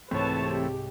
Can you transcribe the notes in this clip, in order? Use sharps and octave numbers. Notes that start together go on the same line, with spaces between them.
C2 G#2 E3 A3 C4 B4 C#5 A5
G4